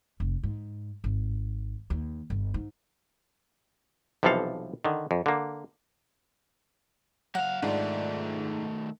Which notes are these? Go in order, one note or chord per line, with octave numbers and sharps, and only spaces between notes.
F1
G#2
G#1
D#2
G1
G#2
B1 C3 E3 F3 A4 F5
D3 D#3
F2
D3 A#3
F#3 F5 F#5
G#2 D#3 A3 D4 F4